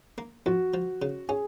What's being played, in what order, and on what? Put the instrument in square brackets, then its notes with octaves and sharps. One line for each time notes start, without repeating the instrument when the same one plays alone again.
[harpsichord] A#3
[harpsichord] F2 [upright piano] F#4
[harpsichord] F3
C#3
[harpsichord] C#4 [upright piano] G#4